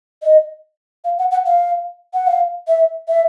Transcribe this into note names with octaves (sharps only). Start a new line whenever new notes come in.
D#5
F5
F#5
F#5
F5
F#5
F5
E5
E5